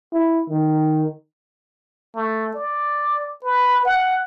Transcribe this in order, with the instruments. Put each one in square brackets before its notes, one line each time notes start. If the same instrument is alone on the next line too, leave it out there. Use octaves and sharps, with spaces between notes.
[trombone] E4
D#3
[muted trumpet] A3
D5
B4
F#5